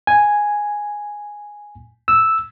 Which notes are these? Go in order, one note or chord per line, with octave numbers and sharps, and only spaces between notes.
G#5
E6